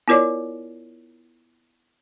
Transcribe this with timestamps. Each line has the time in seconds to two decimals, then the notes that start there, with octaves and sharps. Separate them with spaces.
0.08 B3 E4 F4 A#4 C#5 D5